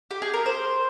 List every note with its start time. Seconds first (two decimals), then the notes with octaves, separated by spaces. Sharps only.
0.11 G4
0.22 G#4
0.33 A#4
0.46 C5